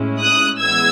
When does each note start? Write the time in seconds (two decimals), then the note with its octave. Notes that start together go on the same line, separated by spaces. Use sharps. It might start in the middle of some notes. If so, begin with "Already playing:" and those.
Already playing: A2 G#3 C#4 E4
0.21 D#6 F#6
0.60 E3 G#3 B3 E6 G#6